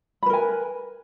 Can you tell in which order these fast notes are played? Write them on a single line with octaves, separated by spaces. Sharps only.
B5 B4 A#4 G#5